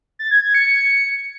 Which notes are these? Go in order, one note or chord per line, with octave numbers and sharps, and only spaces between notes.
A6
G#6
G#6
C#7